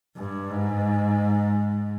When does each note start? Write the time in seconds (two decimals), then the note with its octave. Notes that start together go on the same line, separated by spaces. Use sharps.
0.17 G2
0.50 G#2